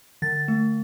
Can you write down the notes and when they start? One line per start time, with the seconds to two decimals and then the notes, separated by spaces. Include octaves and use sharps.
0.22 D3 A6
0.48 A3